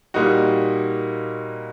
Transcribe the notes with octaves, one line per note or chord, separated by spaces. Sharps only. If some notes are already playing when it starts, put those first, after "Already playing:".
A#2 G3 A#3 D#4 F#4